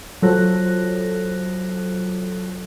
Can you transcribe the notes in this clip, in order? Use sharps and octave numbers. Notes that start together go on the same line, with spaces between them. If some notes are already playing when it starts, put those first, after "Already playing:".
F#3 F4 A4 C5 F#6 A#6